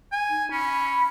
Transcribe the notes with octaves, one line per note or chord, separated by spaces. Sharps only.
G#5
D#4
C#4 B5